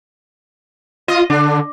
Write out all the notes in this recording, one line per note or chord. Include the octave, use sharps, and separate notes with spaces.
F4 D#5
D3 D4